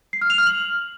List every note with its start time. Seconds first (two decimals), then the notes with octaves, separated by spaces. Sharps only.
0.13 C7
0.21 F6
0.30 F7
0.38 F6
0.47 F#7